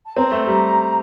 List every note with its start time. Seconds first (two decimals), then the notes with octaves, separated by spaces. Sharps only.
0.06 A5
0.17 C4 A#5
0.31 A3
0.47 G3